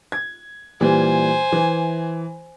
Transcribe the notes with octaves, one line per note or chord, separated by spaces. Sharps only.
G#6
A#2 E3 G3 C5 G#5
E3